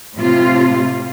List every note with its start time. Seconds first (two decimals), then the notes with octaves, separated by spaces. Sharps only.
0.15 A2 C3 F4